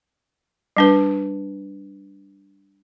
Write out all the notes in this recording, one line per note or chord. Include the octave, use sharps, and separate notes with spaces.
G3 D4 B4